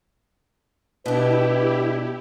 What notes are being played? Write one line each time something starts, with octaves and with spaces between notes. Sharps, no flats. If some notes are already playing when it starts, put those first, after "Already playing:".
B2 D4 E4 G4 B4